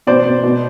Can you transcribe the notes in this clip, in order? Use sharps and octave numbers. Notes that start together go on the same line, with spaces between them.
B2 C5 D5
B2
B2